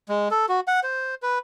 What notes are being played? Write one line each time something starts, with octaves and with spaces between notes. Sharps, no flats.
G#3
A4
F#4
F#5
C5
B4